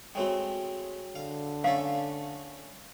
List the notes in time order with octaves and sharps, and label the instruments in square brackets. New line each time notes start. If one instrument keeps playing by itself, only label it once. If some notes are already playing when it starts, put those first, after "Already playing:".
[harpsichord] G#3 A3 C4 [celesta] F#4 C#5 G5
[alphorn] D3 [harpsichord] F5
[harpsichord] A3 C#4 A4 [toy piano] F5 [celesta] C7